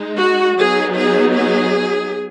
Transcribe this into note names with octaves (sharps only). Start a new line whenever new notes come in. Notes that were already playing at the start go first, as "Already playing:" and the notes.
Already playing: G#3 D#4
F#4
F#3 B3 D#4 G#4
G#4
G#4